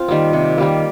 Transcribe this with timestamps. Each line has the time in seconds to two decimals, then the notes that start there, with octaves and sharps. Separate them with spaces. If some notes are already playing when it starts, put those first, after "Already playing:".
Already playing: C4 F4 C5
0.08 D#3 G3 A#3
0.33 C3
0.58 D#3 G3 A#3